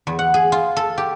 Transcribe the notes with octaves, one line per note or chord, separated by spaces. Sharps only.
E2
F#5
G#4
F4
A4
G4